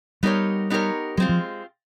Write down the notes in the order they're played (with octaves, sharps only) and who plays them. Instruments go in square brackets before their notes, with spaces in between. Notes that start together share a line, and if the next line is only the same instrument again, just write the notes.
[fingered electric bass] G3 [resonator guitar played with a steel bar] B3 D#4 G4 A#4 C#5
[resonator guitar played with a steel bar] B3 D#4 G4 A#4 C#5
[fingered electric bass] F#3 [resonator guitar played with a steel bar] G#3 C4 F4
[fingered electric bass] F3